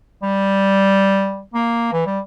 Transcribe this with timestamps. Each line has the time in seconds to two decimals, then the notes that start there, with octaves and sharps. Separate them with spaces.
0.23 G3
1.54 A#3
1.93 E3
2.06 G3